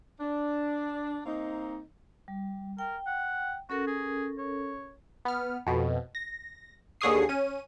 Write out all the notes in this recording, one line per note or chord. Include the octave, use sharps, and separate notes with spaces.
D4
A#3 C4 D#4
G3
A#4 G5
F#5
C#4 F#4 A4 A#4
G#4
C#5
B3 F6
F2 B2
A#6
D#2 D3 G#4 C#6 D#6 C7
C#4 D#7